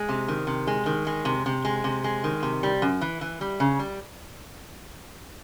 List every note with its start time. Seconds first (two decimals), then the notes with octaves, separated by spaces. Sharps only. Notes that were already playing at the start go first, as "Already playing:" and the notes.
Already playing: G#3
0.09 C3
0.28 D#3
0.47 C3
0.67 G#3
0.86 D#3
1.07 G#3
1.25 C3
1.46 C3
1.65 G#3
1.84 C3
2.04 G#3
2.24 D#3
2.43 C3
2.63 G3
2.82 F#2
3.01 E3
3.21 E3
3.41 G3
3.60 C#3
3.79 G3